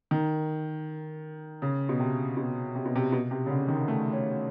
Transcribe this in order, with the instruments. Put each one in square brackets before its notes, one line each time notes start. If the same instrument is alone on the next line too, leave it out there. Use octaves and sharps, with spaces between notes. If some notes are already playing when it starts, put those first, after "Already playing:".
[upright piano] D#3
C#3
B2
C3
B2
C3
B2
C3
B2
C3
C#3
D3
D#3
A3
C#4